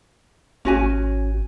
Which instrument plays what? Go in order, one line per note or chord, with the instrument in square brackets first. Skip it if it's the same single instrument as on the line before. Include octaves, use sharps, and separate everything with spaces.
[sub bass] G#1 [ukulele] C#4 F#4 G#5